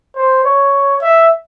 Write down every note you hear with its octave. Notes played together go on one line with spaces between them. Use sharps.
C5
C#5
E5